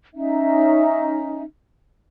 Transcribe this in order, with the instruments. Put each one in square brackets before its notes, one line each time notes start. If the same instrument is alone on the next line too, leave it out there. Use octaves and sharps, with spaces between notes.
[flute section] C#4 D#4 E5